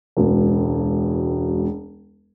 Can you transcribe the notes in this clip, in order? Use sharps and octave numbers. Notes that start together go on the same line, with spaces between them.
E1 C#2 B2